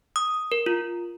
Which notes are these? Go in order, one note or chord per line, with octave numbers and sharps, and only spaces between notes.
D#6
A#4
F4